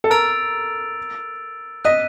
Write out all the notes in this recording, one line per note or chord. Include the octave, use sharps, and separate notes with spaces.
A4
A#4 E6 A6 D7 F7
D#5 F#6 B6 D#7